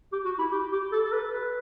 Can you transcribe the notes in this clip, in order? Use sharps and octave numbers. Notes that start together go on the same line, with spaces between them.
G4
F#4
E4
G4
G4
A4
A4
B4
B4